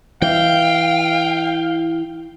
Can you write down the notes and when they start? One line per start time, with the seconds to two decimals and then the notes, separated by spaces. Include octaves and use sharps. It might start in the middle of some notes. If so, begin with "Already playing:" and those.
0.22 E3 F5 G5